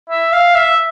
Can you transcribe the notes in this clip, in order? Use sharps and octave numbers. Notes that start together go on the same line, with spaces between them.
E5
F5
E5